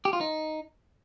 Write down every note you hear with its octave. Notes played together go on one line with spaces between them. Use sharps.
G4
F4
D#4